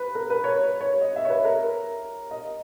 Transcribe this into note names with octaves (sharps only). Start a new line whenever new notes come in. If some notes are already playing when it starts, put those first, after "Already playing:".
Already playing: B4
A#4
B4
C#5
C#5
D#5
E5
C#5
B4
A#4
D#5